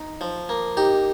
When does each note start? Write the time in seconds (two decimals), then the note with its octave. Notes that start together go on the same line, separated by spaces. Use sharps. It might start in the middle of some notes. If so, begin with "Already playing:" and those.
Already playing: D#4
0.21 F3
0.49 A#3
0.77 D#4 G4